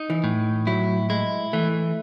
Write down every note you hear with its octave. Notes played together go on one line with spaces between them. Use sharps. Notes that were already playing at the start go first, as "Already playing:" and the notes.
Already playing: D#4
E3
A2
F#3 E4
G#3 E4
E3 A3